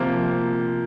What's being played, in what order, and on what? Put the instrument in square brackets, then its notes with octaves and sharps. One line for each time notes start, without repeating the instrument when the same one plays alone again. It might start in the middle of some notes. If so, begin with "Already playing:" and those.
Already playing: [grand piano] C3 F3 A#3